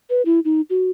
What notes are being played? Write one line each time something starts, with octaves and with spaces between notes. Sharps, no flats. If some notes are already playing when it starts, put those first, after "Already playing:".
B4
E4
D#4
F#4